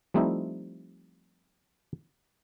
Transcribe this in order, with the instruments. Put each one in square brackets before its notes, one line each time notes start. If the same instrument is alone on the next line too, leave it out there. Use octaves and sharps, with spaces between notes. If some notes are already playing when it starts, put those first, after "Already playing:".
[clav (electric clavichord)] F3 G3 A3 C4 D#4 E4